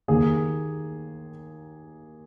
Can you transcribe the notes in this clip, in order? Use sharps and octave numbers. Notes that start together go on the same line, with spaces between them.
D#2 D#3 A#3 G#4